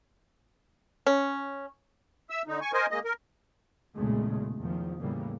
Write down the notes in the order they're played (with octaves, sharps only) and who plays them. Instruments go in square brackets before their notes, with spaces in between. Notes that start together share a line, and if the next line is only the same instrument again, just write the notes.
[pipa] C#4
[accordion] E5 E6
D3 D#4
G#5 C#6
A#4 C5 D#5 G#5
G#3 A#3 D#5
A#4
[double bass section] B1 E2 A#2 C#3 G#3 A3
E2 D#3 F3
E2 A2 C#3 E3 G3 A#3